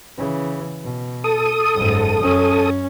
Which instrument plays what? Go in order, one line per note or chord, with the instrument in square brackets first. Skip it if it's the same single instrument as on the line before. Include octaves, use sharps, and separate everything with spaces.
[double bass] C#3 E3
B2
[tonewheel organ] A4 D#6
[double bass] F#1 G#2
F#2 C#4